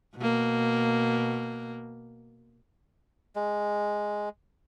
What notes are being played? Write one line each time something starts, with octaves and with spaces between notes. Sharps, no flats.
B2 A#3
G#3